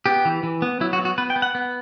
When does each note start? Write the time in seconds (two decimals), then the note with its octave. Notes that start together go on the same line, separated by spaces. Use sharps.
0.06 B3 G4
0.25 E3
0.43 E3
0.62 B3
0.80 F#3 E4
0.93 F#4
0.99 B3
1.05 F#4
1.18 B3 B4
1.30 G5
1.36 B3
1.42 F#5
1.55 B3